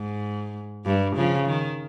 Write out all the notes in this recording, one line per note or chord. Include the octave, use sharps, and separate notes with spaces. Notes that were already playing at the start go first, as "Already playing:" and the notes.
Already playing: G#2
G2
C#3 F3
D#3